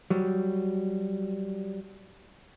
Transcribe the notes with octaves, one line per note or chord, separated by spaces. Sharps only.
F#3 G3